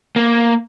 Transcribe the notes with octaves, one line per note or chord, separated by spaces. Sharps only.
A#3